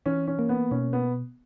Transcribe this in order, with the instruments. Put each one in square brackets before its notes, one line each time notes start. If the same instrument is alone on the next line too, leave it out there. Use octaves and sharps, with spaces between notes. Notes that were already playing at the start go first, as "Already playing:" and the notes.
[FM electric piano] E3 [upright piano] C#4
[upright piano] C#4
[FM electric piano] A#3
[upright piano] B3
[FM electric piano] B2 [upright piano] C#4
[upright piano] B3